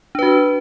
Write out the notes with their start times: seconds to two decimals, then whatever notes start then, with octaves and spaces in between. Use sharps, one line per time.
0.15 D4
0.19 B4
0.23 F#4